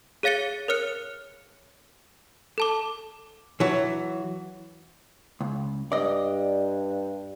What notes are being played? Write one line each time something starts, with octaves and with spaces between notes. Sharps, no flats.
G#4 C#5 F5 A6 C#7 G7
A#4 C#5 F6 C#7
A4 A5 D6
E3 F#3
C#2
G2 D5 D#5